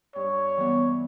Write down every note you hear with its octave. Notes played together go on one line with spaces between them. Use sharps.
G2 C#5
E3 G3 B3